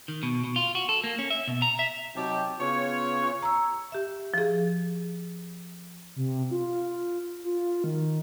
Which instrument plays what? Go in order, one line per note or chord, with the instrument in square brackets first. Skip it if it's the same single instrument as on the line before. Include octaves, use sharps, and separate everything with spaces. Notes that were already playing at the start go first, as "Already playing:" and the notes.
[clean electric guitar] D#3
B2
B2
F4
F#4
A4
A#3
C#4
E5
B2
A#5
E5
[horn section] C3 F#3 D#4 G4 G5 A5
C#3 B3 F4 C#5
[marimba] A#5 E6
G4 E5
F3 G#4
[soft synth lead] C3
F4
F4
D#3